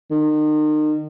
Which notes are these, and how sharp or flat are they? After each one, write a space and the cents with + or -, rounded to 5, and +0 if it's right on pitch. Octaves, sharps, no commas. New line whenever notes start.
D#3 -35